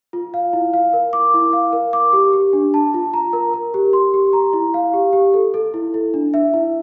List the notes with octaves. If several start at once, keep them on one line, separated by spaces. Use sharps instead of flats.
F4
F5
E4
F5
A#4
D6
E4
F5
A#4
D6
G4
G4
D4
A5
F4
A#5
A#4
A#4
G4
C6
G4
A#5
E4
F5
G4
G4
A4
A4
E4
E4
D4
E5
E4